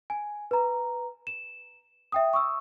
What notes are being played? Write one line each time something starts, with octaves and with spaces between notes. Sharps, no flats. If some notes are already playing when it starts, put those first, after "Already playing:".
G#5
B4 A#5
E7
E5 G5 D#6
C#6 D#6 E6